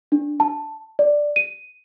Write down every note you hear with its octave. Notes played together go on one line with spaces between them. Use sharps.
D4
A5
D5
D#7